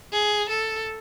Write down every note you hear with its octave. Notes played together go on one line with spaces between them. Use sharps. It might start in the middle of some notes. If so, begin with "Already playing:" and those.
G#4
A4